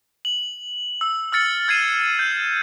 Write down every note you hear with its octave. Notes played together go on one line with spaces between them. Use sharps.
F#7
E6
E6 F6 A6 C#7
F6 G#6 A6 C7 D#7 E7
G6